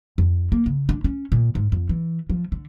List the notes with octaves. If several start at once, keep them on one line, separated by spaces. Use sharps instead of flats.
F2
A#3
C#3
D4
C#4
A#2
G#2
F2
E3
F3
D3